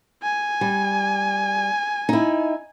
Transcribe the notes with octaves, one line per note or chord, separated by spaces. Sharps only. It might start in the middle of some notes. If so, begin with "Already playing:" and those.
G#5
G3
D#4 E4